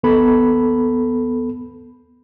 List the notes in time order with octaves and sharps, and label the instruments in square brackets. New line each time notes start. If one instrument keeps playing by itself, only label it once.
[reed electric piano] D#2 B3 A4 B5